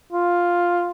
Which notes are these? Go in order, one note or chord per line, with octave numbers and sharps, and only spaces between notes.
F4